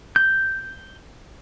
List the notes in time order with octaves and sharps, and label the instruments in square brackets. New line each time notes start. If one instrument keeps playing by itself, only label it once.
[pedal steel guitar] G6